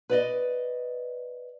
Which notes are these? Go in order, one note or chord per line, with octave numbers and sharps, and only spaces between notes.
B4 D5 D#5